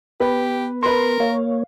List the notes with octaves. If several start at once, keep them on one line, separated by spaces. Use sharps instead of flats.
B3 G4 B4
A#4 B4 C6
A#3 C#5 F5